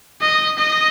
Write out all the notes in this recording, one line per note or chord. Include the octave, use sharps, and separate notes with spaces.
D#5
D#5